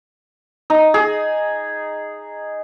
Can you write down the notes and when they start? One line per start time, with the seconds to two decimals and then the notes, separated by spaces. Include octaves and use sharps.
0.70 D#4
0.94 G#4